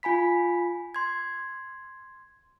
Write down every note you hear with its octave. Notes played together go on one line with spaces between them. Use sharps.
F4 G#5 B5 B6
C6 G#6